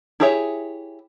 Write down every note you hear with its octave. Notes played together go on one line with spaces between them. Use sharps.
E4 G4 G#4 C#5 E5